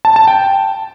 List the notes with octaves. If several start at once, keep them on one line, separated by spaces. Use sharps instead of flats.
A5
A5
G5